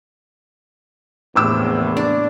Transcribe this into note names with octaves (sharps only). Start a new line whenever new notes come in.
A#1 E2 A2 C3 D6 E6
D4